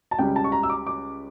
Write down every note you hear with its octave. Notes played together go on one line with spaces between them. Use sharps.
A5
C#2 C#3 G3 G5
A5
C#6
A#5
E6
D6
D6